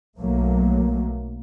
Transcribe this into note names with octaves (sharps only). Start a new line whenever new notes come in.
B1 F#3 A3 A#3